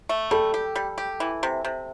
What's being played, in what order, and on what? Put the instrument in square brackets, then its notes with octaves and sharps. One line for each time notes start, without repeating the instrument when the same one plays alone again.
[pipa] A3
[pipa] G3 [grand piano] A4
[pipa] G4
G3
G4
E3
C3
C3